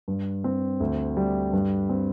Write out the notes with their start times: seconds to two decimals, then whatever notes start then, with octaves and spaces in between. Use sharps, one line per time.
0.08 G2
0.44 C4
0.80 D2
1.17 G3
1.53 G2
1.89 C4